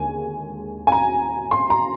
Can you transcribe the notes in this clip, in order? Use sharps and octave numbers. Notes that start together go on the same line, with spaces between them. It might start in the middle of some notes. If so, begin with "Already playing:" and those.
Already playing: D#2 D3 G#3 G#5
G#5
A#5
C6
A#5